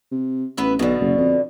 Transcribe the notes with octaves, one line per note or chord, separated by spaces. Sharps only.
C3
A1 B3 B4 E5
B1 B2 D3
F#1
F2